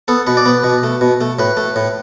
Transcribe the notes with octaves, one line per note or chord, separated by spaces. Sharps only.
B3 A4
B2 B4
D5
B3 B4
B2
A3
B2
A3
A2 B4
A3
A2